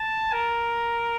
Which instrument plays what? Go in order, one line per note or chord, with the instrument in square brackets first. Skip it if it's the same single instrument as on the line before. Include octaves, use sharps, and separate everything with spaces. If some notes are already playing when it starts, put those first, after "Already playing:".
Already playing: [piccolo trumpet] A5
A#4